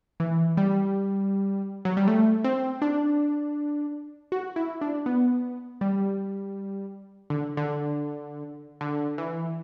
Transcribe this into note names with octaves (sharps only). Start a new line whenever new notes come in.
E3
G3
F#3
G3
A3
C4
D4
F#4
E4
D4
B3
G3
D3
D3
D3
E3